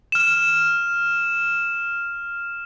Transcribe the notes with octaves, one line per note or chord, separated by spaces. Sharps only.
F6 E7